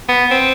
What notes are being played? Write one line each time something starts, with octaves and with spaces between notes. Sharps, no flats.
B3
C4